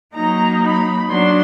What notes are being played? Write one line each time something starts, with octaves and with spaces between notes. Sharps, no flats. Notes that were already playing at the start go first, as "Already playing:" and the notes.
F#3 A#3 D#4 A#5
B5
F#3 B3 D4 C6